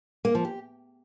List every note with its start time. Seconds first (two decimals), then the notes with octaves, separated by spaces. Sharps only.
0.25 A#3
0.35 F3
0.45 G4